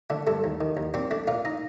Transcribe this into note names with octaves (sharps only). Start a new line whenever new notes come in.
D3 A3 A4
G2 A3 A4
D#2
D#3
D#2
A#2 C4 C5
A3 D4 D5
A#2 F4 F5
D#4 D#5